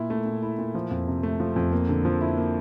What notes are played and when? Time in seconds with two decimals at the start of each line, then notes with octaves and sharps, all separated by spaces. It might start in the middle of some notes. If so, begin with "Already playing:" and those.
Already playing: A#2 E4
0.10 A3
0.26 A#2
0.42 E4
0.58 A#2
0.75 F3
0.91 F2
1.08 C3
1.23 A3
1.40 F3
1.56 F2
1.73 A#3
1.89 D3
2.05 F3
2.21 E4
2.37 A#3